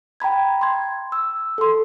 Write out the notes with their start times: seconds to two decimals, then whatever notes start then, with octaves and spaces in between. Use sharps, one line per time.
0.20 G5 A#5 B5 G#6
0.61 C6 G#6
1.12 E6
1.58 A4 C6